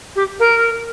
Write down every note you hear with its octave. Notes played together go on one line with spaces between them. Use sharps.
G4
A#4